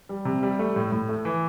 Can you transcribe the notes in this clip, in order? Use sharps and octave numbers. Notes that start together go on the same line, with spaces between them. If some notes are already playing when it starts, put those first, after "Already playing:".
G3
C3
G3
A3
A2
A2
A3
E3